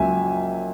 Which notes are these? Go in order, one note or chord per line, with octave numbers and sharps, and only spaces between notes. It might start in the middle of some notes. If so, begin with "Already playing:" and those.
Already playing: C#2 F#3 A#3 E5 G#5